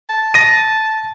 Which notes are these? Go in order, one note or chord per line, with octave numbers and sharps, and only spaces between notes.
A5
A#6 D#7